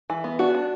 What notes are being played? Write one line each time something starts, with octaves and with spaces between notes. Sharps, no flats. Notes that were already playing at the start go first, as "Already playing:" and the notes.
E3
B3
D4 F#4
D4